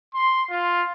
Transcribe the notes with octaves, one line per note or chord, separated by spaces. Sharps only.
C6
F4